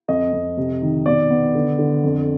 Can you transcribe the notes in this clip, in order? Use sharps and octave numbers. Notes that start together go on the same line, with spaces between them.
F2 D#5
F2
C3
D#3
B2 D5
B3
D3
D3
F2